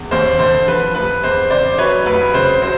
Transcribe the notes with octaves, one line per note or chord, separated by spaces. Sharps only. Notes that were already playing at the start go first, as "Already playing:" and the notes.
Already playing: E2
D#2 C5
D3 C5
F3 B4
F1 B4
E2 C5
C#3 C5 D5
F#3 B4 C#5
F1 B4
C#3 C5
F#3 C5